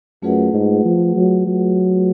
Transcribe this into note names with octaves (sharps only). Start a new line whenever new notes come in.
F#2 A3 F4 G#4 B4 F#5
G#2
F3
F#3
F#3